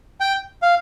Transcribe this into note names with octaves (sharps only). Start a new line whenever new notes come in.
G5
F5